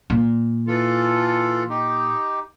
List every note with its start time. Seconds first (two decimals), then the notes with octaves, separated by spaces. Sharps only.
0.10 A#2
0.67 E3 F4 A4
1.70 D#4 G4